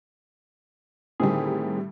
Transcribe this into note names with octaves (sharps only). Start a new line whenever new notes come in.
A2 D3 D#3 G3 C4 G#4